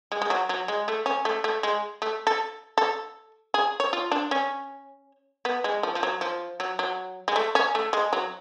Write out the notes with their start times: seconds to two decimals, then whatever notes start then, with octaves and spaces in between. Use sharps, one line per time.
0.12 G#3
0.22 G#3
0.30 F#3
0.49 F#3
0.68 G#3
0.88 A3
1.06 C#4
1.25 A3
1.44 A3
1.63 G#3
2.02 A3
2.27 A4
2.78 A4
3.54 G#4
3.80 C#5
3.93 F4
4.12 D4
4.31 C#4
5.45 B3
5.64 G#3
5.83 F3
5.95 F3
6.03 F#3
6.21 F3
6.60 F#3
6.79 F#3
7.28 G#3
7.36 A3
7.55 C#4
7.75 A3
7.93 G#3
8.13 F#3